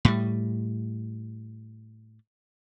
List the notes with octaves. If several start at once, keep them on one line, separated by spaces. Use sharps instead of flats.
A2 G3